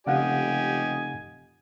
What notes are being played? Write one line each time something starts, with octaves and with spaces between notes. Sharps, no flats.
F1 C#3 G4 D#5 F5 F#5 G#5